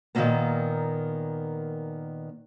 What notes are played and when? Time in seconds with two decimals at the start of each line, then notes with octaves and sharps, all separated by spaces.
0.15 A#2 D#3 F3 F#3 A#3 B3